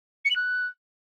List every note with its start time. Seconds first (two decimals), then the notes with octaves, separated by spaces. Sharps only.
0.25 C#7
0.30 F#7
0.36 F#6